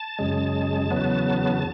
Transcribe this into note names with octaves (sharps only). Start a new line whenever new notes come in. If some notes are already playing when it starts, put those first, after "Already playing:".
Already playing: A5
F#2 C#3 G#3
E2 C#3 F#3 B3